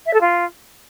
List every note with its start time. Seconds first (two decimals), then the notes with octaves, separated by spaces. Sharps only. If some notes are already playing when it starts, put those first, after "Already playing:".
0.06 E5
0.13 A4
0.20 F4